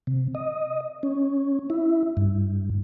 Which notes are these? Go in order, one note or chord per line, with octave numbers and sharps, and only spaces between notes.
C3
D#5
C#4
E4
G2